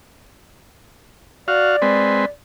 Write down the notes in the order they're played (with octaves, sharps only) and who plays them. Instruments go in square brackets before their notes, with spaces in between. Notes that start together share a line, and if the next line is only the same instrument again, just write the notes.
[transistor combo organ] F#4 F5 [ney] D5
[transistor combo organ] G#3 C4 B4